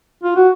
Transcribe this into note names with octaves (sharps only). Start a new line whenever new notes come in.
F4
F#4